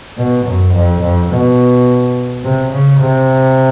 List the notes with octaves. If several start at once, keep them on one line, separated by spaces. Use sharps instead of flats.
B2
F#2
F2
F2
B2
C3
C#3
C3